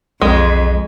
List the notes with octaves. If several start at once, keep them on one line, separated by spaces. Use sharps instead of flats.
B1 F2 G#3